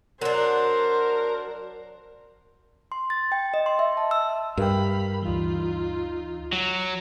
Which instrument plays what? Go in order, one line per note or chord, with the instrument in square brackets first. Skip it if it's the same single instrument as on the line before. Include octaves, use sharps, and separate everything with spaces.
[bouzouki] F#3 D4 [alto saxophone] A#4 [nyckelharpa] C5
[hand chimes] C6
A6
G5
D#5
C6
E5
A5
E6
[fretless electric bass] G2 [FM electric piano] A#4 G5 [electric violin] F5 B5
[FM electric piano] D2 E3 [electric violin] D#4 F4
[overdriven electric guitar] F#3